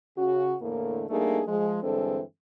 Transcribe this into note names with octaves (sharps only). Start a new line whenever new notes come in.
C#3 F#4
E2 A2 D3 A3 A#3
G3 A3 A#3 D4 D#4 G#4
F3 G#3
G2 D3 E3 G#3 C4 A4